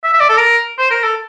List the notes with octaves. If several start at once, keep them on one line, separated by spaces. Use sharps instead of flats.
E5
E5
D5
A4
A#4
C5
A#4
A4